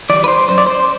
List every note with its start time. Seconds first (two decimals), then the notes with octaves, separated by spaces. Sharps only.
0.10 E3 G3 D5
0.24 B4
0.28 C5
0.48 F#2 C5
0.58 D5
0.67 C5